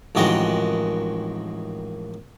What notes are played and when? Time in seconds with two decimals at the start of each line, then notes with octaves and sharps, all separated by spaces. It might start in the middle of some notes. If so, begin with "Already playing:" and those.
0.15 A1 F2 D#3 G#3 F#4 G5